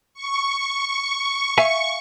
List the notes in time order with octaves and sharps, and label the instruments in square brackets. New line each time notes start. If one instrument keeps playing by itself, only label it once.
[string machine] C#6
[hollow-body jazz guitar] E5 F5 G#5